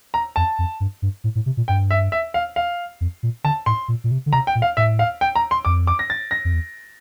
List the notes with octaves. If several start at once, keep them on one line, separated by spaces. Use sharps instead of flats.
A#5
F2 A5
F2
G2
G2
A2
A2
C3
A#2
G2 G5
E5
E5
F5
F5
F2
A#2
D3 A5
A2 C6
A#2
A#2
C3
D3
C3 A#5
G5
A#2
F5
A2 E5
F5
G5
A#5
C6
F2 D6
D6
A#6
A6
A#6
F2
E2